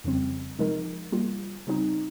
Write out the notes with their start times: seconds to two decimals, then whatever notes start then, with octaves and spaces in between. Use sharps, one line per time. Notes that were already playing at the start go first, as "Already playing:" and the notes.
0.04 F2 C#3 G3 C4
0.59 C3 F3 G#3 D#4 A#4
1.12 G3 A#3 F4
1.67 C#3 G3 C4 D#4